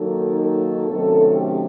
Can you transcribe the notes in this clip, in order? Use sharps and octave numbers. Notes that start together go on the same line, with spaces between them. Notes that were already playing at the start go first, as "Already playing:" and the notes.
Already playing: D#3 F#3 A#3 D#4 A4
A4
C3 D#3 F#3 A3 C#4 A4
G4